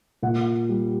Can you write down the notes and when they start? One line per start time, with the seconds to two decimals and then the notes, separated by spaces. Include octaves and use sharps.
0.22 A#2 F#5
0.69 G3